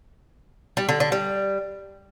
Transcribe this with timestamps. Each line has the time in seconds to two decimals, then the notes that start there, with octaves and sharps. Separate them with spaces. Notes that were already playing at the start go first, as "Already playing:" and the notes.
0.77 G3
0.89 D3
1.00 D3
1.12 G3